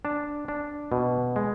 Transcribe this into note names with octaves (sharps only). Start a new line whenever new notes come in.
D4 A5
D4
B2
G#3